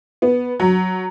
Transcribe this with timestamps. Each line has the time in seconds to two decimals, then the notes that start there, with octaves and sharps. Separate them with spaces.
0.22 B3
0.60 F#3